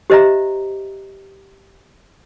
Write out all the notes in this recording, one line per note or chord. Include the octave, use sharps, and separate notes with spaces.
G4 C5 D#5 E5 A#5